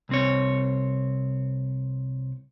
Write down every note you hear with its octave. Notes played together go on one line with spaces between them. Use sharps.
C2 C4 C#5